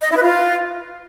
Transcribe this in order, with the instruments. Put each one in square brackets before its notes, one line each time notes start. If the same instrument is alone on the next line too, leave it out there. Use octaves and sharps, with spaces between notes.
[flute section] D#5
E4
B4
F4